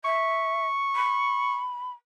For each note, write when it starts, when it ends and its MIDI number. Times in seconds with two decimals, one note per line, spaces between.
0.04 0.66 76
0.04 1.59 85
0.95 1.92 83